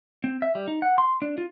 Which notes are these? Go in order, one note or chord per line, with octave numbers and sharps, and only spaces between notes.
C4
E5
G3
D#4
F#5
C6
D4
F4